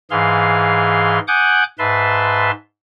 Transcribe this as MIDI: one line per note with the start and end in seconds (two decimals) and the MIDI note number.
0.11 1.19 44
0.11 1.19 52
0.11 1.19 68
0.11 1.19 77
0.11 1.19 84
1.28 1.64 78
1.28 1.64 80
1.28 1.64 86
1.28 1.64 87
1.28 1.64 90
1.28 1.64 91
1.79 2.51 44
1.79 2.51 71
1.79 2.51 76
1.79 2.51 81
1.79 2.51 84